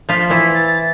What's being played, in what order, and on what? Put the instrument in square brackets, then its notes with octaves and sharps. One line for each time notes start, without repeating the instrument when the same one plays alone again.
[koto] F3 F4 [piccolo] B6
[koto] E3 E4 [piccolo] B6
[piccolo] A6